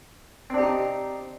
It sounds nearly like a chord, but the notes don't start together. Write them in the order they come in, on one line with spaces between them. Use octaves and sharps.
C4 D4 G4 D#4